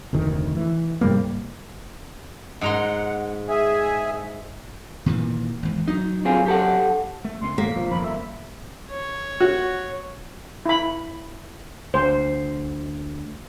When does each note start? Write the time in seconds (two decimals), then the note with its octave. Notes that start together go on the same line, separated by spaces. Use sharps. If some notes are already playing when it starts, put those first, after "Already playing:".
0.13 F1 D2 D#3
0.56 E3
1.01 G#2 C3 G3 A#3
2.61 G#2 F#5 A#5 C6
3.49 G#4 E5 G#5
5.06 A#2 D#3 E3
5.63 G#1 E2
5.88 F#3 D#4
6.25 C4 F4 G#4
6.46 G4 A4 F#5
7.25 A3
7.41 C#2 B3 C#4 C6
7.58 D#2 B2 D3 A#3 B6
7.76 E1 F3
7.91 D#1 F2 B5
8.04 E5
8.91 C#5
9.40 F#4
10.66 E4 B5
11.94 D2 C5